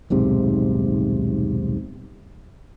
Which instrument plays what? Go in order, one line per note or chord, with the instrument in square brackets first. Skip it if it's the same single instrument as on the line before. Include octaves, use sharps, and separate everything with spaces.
[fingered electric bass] D#1 B1 G#2 C3